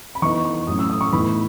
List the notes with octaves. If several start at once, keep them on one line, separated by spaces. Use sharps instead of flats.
B5
E3 B3 D#4 C#6
C#6
A2 F#3 C#4 D#6
E6
D#6
C#6
A2 E3 B3 D#4 B5